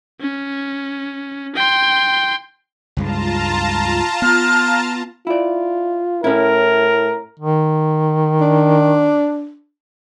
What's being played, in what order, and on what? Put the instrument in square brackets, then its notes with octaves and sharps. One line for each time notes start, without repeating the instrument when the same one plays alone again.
[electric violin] C#4
G5 C6
[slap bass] C#2 G2 G#3 [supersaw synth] F4 A5 A#5
[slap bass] B3 [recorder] F6
[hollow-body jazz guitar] E4 D5 [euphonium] F4
[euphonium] A2 [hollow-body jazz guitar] C#4 E4 [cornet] A#4
[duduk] D#3
[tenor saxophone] D4